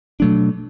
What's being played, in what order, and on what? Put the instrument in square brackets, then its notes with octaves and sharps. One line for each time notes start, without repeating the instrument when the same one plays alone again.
[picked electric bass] B2 F#3 A3 D4